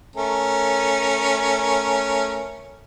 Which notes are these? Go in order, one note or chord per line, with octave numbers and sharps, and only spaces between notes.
A3 C#4 A#4